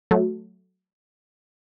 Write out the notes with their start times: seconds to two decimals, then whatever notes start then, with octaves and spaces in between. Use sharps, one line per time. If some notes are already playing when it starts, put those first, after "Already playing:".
0.11 F#3 A3